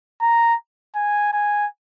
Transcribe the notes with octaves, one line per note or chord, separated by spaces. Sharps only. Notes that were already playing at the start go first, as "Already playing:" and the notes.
A#5
G#5
G#5